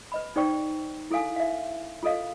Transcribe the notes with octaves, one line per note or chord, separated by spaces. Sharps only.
B4 D#5 B5
D#4 G#4 C5 D5 G5 C#6
E4 G#4 A4 F5 G#5
E5 F5
F4 G#4 A4 D#5 F5